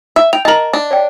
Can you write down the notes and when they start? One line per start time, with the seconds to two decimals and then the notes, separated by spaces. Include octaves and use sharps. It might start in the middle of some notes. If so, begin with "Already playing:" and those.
0.16 E5
0.33 G5 F7
0.45 A#4 D#5 A5 F#7
0.73 D4
0.91 C#5 D5 G5